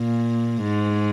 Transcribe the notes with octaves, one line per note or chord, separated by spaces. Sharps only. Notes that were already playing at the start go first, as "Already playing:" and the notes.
Already playing: A#2
G#2